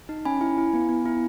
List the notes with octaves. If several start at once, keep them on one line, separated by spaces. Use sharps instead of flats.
D#4
C#4 G#5 B5
E4
E4
B3
B3
E4